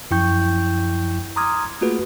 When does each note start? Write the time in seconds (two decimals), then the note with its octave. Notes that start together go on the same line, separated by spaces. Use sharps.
0.11 F#2 F3 E4 G5 C#6 G6
1.36 A#5 C6 D6 D#6 F6 G#6
1.81 A3 A#3 F4 F#4 G#4 B4